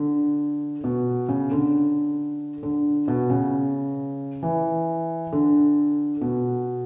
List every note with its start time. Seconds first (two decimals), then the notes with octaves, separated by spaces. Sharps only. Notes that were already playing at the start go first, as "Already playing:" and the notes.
Already playing: D3
0.84 B2
1.29 C#3
1.51 D3
2.63 D3
3.08 B2
3.30 C#3
4.43 E3
5.32 D3
6.21 B2